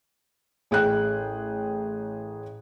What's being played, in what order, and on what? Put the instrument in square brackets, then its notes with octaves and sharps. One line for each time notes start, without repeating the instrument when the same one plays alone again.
[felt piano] A1 G#4 G5 F#6